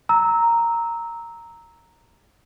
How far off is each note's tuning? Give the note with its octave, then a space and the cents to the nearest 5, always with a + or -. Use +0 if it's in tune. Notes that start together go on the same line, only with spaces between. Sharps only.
A#5 -5 E6 -20